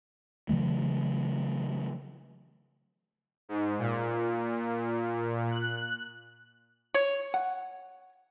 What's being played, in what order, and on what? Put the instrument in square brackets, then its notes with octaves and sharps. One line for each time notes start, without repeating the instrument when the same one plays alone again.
[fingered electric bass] C#3 E3 F#3 A3
[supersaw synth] G#2
A#2
F#6
[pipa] C#5
[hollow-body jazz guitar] F#5